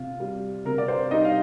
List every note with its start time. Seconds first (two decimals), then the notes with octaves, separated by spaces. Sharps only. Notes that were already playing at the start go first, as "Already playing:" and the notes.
Already playing: C3 F4
0.20 G3
0.65 C3 A#4
0.78 D5
0.88 C5
1.11 G3 D#4 D#5
1.25 F5